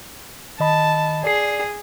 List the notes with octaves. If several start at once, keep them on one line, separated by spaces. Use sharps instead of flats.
D#3 D#5 A5 B5
G#4 D5 C7